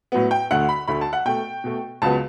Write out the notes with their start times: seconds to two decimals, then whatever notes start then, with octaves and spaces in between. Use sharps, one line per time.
0.12 A2 F#3 B3
0.31 G5
0.51 D2 D3 A3 F#5
0.69 B5
0.88 D2 D3 A3 B5
1.01 A5
1.13 F#5
1.25 B2 A3 G5
1.64 B2 A3
2.02 C#2 C#3 F#3 B3 A5